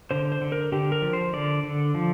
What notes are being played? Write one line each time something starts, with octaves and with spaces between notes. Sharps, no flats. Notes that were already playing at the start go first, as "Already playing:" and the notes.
D3 C5
C5
D3
A#4
D3 G4
A#4
F3
C5
D3 D5
D3
F3